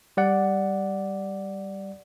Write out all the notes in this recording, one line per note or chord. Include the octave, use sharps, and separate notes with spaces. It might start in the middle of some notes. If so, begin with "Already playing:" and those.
G3 D5 F#5